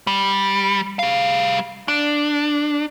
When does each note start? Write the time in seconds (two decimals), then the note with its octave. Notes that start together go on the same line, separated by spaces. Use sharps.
0.07 G3
0.99 G3 F5
1.88 D4